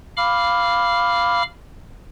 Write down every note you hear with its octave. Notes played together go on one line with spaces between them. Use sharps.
F5 B5 D6 F6